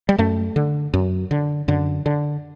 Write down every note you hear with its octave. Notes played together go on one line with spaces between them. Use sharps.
G3
F#2 A3
D3
F#2
D3
F#2 D3
D3